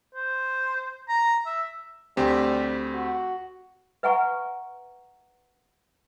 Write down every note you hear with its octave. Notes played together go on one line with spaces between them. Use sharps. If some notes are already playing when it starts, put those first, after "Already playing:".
C5
A#5
E5
D2 G3 C4 G4
F#4
B4 E5 F#5 G#5 A#5 C#6